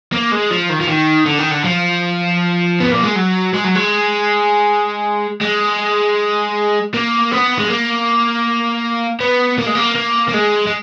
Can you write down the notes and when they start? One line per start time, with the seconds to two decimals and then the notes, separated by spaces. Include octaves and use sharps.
0.12 A#3
0.32 G#3
0.50 F3
0.70 D#3
0.81 F3
0.89 D#3
1.26 D3
1.39 D#3
1.51 D3
1.64 F3
2.80 B3
2.92 A#3
3.03 G#3
3.16 F#3
3.54 G#3
3.64 F#3
3.75 G#3
5.42 G#3
6.94 A#3
7.31 B3
7.59 G#3
7.69 A#3
9.21 B3
9.59 A#3
9.67 G#3
9.76 A#3
9.96 A#3
10.28 A#3
10.34 G#3
10.67 G#3